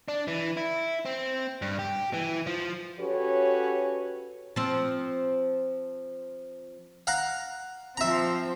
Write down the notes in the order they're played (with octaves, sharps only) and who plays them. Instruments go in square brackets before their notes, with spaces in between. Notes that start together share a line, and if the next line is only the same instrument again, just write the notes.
[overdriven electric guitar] D4
E3
E4
C4
G2
G4
E3
F3
[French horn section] C#4 F#4 G4 A4 B4 C#5
[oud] F3 C4
[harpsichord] F5 F#5 A#5
[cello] F3 C4 [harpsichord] E5 A#5